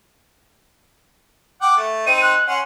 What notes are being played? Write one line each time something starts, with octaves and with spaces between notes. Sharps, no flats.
F#5 G5 D6
A3
C4 D#4 C5 D#7
F#6
C#4 F#5 C6